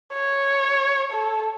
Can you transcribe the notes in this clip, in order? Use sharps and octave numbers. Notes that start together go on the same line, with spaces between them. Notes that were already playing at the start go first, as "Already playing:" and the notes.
C#5
A4